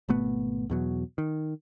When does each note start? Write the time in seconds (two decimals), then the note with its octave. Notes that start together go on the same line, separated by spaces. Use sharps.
0.09 G#1 B2 A3 B3
0.70 E2 B2 F#3
1.18 D#3